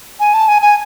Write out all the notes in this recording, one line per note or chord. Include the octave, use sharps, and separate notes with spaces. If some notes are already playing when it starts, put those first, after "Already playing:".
G#5
A5
G#5
G#5